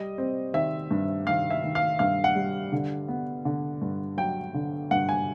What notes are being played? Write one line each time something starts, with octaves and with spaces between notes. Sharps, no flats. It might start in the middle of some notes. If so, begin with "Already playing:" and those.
Already playing: G3 D#5
C4
D#3 E5
G2
D#3 F5
E5
D#3
F5
G2 F5
F#5
G3
D3
B3
D3
G2
F#3 G5
D3
G2 F#5
G#5